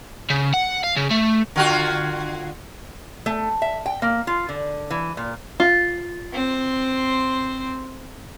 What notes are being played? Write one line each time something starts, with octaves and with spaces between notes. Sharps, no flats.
C#3
F#5
F5
C#3
A3
D3 F4 F#4
A3
E5
G5
A#3
F4
D3
E3
A#2
F4
C4 C5